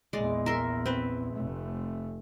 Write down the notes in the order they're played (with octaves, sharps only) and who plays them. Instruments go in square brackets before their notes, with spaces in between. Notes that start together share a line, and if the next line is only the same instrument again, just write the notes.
[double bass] A#1 E2 [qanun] G#3 D5
[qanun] A#4 E5 C6
C4 B4
[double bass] F1 A3